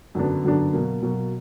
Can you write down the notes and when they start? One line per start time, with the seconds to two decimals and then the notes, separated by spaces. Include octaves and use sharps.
0.15 F#2 D3 F#3 B3 D4
0.44 F#2 D3 F#3 B3 D4
0.73 B2 F#3 A#3
1.02 B2 F#3 A#3